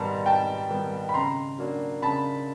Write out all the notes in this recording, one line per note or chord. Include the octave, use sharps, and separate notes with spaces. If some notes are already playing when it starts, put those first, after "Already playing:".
Already playing: G#2 D#3 G3 B3 A5 A#5
G#2 G5 A5
D#3 G3 B3
B5
C#3 A#5 C6
F#3 A#3 D4
C#3 A5 B5